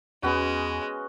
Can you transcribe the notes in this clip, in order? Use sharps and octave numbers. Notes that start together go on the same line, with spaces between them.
E2 G#3 B3 C#4 F#4